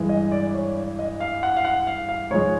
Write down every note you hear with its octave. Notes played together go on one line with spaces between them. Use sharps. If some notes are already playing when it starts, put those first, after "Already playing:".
Already playing: G2 E3 G#3
D#5
D5
C#5
D5
D#5
F5
F#5
F5
F#5
F5
F5
G#2 F3 G#3 C#5